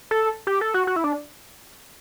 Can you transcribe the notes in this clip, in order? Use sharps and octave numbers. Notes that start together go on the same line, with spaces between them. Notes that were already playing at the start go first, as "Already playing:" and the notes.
A4
G4
A4
F#4
F#4
E4
D4